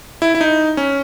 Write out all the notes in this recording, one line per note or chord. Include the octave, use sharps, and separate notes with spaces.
E4
E4
D#4
C#4